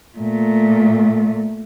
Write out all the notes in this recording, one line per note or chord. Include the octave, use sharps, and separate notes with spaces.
A#2 A3